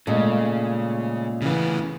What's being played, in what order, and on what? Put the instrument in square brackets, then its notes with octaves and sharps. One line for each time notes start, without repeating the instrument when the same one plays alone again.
[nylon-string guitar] A#2 G#3 [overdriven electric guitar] C#3 [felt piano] A3 D#5
[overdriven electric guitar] A2 B3 [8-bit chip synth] C#3 E3